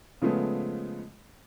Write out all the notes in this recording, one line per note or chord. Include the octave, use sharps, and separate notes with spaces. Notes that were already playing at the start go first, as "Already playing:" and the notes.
C#3 F3 G#3 A3 B3